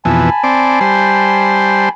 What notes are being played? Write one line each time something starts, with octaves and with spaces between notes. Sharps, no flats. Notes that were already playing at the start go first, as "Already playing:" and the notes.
F2 B2 E3 G#5 A5 B5
C4 D5
G3 C5